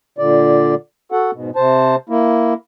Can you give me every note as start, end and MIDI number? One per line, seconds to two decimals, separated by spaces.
0.18 0.75 46
0.18 0.75 50
0.18 0.75 74
1.12 1.31 66
1.12 1.31 69
1.12 1.31 78
1.33 1.50 44
1.33 1.50 47
1.56 1.96 48
1.56 1.96 72
1.56 1.96 81
2.09 2.54 58
2.09 2.54 64